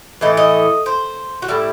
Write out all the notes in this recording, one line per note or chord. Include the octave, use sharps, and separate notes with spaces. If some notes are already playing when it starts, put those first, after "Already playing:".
A2 E3 A3 D#5
D#5
C5
F#4
A2 G3 E4